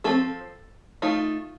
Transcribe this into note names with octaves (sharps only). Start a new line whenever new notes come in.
F3 A3 C4 A4
A3 D#4 F4